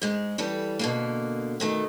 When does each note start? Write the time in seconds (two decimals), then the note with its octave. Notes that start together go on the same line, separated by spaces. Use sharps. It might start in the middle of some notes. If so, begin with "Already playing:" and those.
0.02 G#2 G#3
0.38 E3 G3 A4
0.79 B2 D3 A#3
1.60 B2 D#3 A3